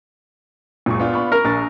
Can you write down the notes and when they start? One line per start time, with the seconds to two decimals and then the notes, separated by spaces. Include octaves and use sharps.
0.86 F#1 C#2 A#2 C#6
1.00 B3 D4 F4
1.14 B5 C#6
1.32 A#4
1.45 A#1 C#6 A6